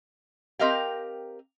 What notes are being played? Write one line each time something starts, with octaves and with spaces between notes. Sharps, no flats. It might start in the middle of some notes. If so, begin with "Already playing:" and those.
C4 G4 A#4 D#5 F5 G5